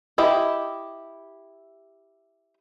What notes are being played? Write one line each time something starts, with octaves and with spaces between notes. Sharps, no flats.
E4 G4 D#5